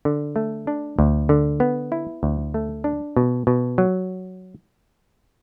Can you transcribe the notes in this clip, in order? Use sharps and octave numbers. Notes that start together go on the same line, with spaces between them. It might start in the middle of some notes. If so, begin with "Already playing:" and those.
D3
A3
D4
D2
D3
B3
E4
D2
A3
D4
B2
B2
F#3